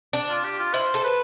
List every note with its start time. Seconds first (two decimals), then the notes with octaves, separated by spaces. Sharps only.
0.13 D4
0.29 F4
0.44 G4
0.59 F4
0.74 E4 C5
0.94 A4
1.04 B4